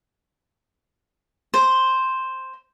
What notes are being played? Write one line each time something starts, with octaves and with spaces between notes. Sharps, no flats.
C5